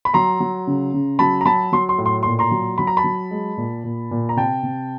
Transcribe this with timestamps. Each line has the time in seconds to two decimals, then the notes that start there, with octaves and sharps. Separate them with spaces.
0.05 B5
0.14 F#3 A#5 C6
0.40 F#3
0.67 C#3
0.93 C#3
1.19 F#3 A5 B5
1.41 A#5
1.45 F#3 A5 B5
1.73 F#3 C6
1.89 C6
1.98 A2
2.06 C6
2.23 A#2 C6
2.39 A#5 C6
2.51 F#3
2.78 F#3 B5
2.87 A#5
2.97 A5 B5
3.04 F#3
3.31 G#3
3.57 A#2
3.84 A#2
4.11 A#2
4.29 A#5
4.36 C3 G5 A5
4.63 C3